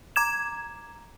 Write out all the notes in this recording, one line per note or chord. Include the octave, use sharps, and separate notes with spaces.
A#5 D6 G#6 E7